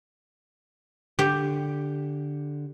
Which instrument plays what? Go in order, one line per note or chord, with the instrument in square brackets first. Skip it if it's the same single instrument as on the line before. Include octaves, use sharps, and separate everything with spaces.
[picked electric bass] D3 [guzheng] G4